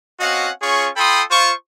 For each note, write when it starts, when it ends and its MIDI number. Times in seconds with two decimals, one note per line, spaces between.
0.20 0.50 60
0.20 0.50 61
0.20 0.50 66
0.20 0.50 75
0.20 0.50 77
0.20 0.50 78
0.62 0.89 61
0.62 0.89 65
0.62 0.89 68
0.62 0.89 73
0.62 0.89 85
0.96 1.23 65
0.96 1.23 69
0.96 1.23 79
0.96 1.23 83
0.96 1.23 84
0.96 1.23 87
1.31 1.52 65
1.31 1.52 72
1.31 1.52 85